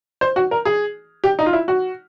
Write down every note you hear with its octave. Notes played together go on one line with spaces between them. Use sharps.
C5
F#4
A#4
G#4
G4
D#4
F4
E4
F#4